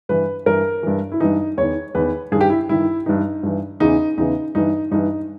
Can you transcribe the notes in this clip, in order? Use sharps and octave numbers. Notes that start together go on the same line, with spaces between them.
G2 E3 B4
G2 E3 A#4
G2 E3
E4
G2 E3 D#4
E2 D#3 C#5
E2 D#3 B4
G2 D#3 G#4
G4
E4
G2 D#3 E4
G2 E3 D#4
G2 E3
E2 C#3 E3 D#4
E2 C#3 E3 D#4
G2 E3 D#4
G2 E3 D#4